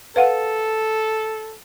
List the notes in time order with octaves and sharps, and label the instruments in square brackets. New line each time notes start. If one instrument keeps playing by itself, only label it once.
[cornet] A4 [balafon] B4 F5 F#5